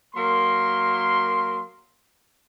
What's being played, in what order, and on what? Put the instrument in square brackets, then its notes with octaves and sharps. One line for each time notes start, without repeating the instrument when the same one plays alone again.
[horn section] F#3 A#3 A#4 C6